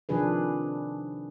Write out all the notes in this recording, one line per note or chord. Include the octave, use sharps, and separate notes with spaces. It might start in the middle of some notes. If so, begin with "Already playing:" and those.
C3 D#3 F3 D4 G#4 B4